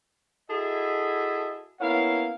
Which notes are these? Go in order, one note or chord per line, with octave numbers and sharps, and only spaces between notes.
E4 F#4 G#4 A4 D#5 E5
A#3 B3 C#4 E4 F5